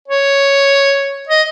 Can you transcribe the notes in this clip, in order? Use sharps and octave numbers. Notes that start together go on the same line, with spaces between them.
C#5
D#5